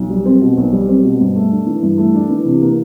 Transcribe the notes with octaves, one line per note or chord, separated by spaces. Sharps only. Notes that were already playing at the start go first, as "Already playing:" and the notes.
Already playing: B1
G3
C4
B2
B1
G3
C4
B2
G2
A3
D4
E3
G2
A3
D4
E3
C3
A#3